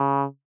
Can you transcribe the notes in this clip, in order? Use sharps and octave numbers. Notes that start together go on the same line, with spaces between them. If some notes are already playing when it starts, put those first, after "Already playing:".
Already playing: C#3